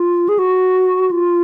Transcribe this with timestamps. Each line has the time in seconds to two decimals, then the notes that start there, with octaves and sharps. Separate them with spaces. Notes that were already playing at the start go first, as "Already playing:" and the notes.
Already playing: F4
0.29 G#4
0.39 F#4
1.11 F4